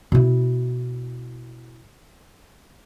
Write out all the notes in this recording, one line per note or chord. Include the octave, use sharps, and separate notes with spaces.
B2 E4